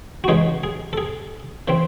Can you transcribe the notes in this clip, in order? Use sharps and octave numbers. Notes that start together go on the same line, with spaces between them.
F#4
C#3 E3 G#3 D#4 G#4
G#4
A4
G#4
C#3 E3 C4